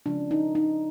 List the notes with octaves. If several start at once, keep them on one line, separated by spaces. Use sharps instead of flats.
C#3 F3 G#3 C#4 D4
D#4
D#4